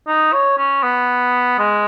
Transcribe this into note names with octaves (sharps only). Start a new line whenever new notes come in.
D#4
C#5
C#4
B3
G#3